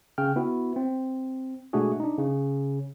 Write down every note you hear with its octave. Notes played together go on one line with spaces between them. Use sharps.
C#3 G5 F6
B3 E4 F#4
C4
B2 G#3 A3 D4 F#4 G#4
D4 D#4
C#3